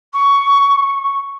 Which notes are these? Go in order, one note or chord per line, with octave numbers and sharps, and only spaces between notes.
C#6